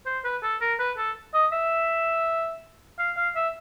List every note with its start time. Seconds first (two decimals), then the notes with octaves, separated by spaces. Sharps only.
0.06 C5
0.24 B4
0.43 A4
0.61 A#4
0.79 B4
0.97 A4
1.34 D#5
1.52 E5
2.99 F5
3.17 F5
3.36 E5